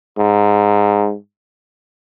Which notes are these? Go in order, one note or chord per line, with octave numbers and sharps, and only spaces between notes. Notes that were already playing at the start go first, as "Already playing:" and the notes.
G#2